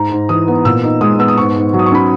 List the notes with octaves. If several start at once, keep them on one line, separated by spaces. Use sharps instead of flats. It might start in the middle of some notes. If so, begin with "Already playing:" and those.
Already playing: G#2 A#5
G#2
E3 D#6
B3
A#2 E6
D#4
G#3 D#6
B3 E6
D#6
G#2 C#6
G#2
F#3
D#6
C#6
C#4 B5